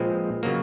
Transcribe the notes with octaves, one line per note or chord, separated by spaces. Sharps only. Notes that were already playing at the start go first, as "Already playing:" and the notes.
Already playing: A#2 F3 G#3 C4 B4
C#3 F#3 A#3